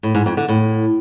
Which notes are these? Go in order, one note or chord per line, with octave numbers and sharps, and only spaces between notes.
A2
G#2
F2
D3
A2